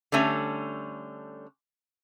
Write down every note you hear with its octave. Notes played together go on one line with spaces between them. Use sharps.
D3 G3 A3 C#4